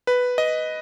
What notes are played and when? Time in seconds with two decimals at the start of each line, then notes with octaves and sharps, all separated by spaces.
0.07 B4
0.38 D#5